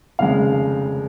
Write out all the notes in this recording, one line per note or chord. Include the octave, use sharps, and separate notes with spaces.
F1 D#2 C#3 G#3 F5